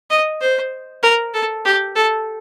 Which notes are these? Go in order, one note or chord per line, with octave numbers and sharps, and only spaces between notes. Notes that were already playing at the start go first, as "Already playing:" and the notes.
D#5
C5
A#4
A4
G4
A4